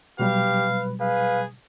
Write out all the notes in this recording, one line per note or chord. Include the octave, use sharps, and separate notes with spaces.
B2 F#3 G3 G4 B4 F5
G#4 B4 F5